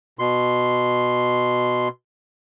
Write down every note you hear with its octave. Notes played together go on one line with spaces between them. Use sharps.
B2 C6